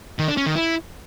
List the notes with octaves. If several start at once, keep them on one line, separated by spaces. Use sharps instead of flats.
D#3
D4
C#4
D#3
E4